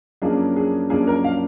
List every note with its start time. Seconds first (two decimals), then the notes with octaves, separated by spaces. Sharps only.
0.22 F#2 F3 A#3 D4 G#4
0.56 G#4
0.90 F#2 F3 A#3 D4 G#4
1.07 A#4
1.24 F5